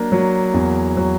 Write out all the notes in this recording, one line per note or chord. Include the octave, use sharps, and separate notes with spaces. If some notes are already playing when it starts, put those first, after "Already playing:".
Already playing: F#3 A#3 D4
F#3
E2
F#3